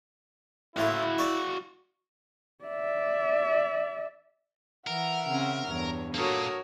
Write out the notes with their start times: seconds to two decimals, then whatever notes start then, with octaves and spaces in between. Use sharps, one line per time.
0.76 A2 A3 E4 F#4 F5 C6
1.18 C#5 D5 C#6
2.64 D5 E5
4.87 E3 A#4 E5 F#5
5.28 C#3 C4 C#4
5.67 E2 G2 C#5
6.14 A#2 A#3 F#4 A4 A#4 C#5 D#6